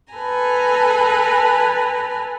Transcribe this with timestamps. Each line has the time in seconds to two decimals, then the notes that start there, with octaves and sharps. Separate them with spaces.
0.13 A4 B4 G#5 A#5